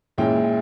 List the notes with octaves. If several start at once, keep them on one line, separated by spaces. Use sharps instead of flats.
A#2 G#3 C#4 E4 G5